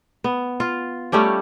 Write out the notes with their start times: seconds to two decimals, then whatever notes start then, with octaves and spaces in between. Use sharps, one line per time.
0.24 B3
0.60 F4
1.12 G3 A3 C#4 G4